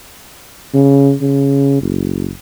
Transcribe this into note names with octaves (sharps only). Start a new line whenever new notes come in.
C#3
C#3
F#1